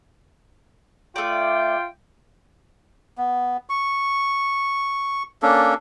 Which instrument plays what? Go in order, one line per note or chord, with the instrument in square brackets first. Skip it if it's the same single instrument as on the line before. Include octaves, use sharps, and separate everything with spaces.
[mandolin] A3 D5 [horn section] F4 G5
[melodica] B3
C#6
A#3 C#4 D4 A4